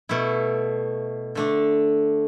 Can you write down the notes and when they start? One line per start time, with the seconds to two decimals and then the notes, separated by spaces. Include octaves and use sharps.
0.09 B2 A3 E4
1.35 D3 A3 D4